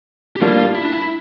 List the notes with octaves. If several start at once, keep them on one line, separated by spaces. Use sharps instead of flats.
G4
A2 G3 A#3 D4 F4
E4
D4
E4